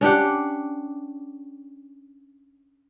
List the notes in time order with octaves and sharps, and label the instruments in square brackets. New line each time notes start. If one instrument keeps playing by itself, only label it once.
[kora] C#4 D4 G4 F#5